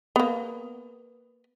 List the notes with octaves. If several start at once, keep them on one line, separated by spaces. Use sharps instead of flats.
A#3 B3